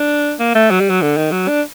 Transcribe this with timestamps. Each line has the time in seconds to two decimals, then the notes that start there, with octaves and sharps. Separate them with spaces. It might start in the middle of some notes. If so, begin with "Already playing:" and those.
Already playing: D4
0.39 A#3
0.55 A3
0.71 F#3
0.80 G3
0.90 F#3
1.02 D3
1.17 D#3
1.32 F#3
1.48 D4